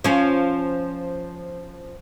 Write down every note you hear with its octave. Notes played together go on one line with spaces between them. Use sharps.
F3 C#4